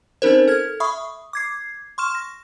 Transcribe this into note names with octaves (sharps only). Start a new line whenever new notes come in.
C4 C#4 D#4 A#4 C5
A4 F6 G#6
E5 B5 C#6 D#6
D6 G#6 C7
C6 C#6 F6 E7
A#6